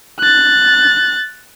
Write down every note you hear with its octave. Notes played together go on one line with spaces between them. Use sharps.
F#6 A6